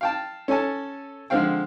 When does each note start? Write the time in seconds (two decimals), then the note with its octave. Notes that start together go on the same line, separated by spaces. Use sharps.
0.01 F5 G5 A5
0.48 C#4 A4 C#5 G#5 A5
1.30 D3 F3 G#3 C4 F5 G5